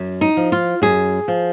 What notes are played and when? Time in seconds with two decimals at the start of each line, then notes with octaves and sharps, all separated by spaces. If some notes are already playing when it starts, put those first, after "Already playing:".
Already playing: F#2
0.21 D#4
0.37 F3
0.52 F4
0.82 F#2 G#4
1.28 F3